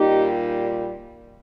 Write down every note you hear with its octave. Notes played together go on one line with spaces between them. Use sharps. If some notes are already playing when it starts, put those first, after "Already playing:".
Already playing: A#2 G3 D#4 G4